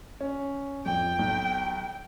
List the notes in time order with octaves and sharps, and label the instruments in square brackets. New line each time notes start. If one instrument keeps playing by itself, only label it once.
[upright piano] C#4
[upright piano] F2 [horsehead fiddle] G5
[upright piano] B1